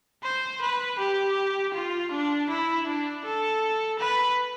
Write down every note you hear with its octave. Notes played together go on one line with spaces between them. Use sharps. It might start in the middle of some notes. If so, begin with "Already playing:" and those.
C5
B4
G4
F4
D4
E4
D4
A4
B4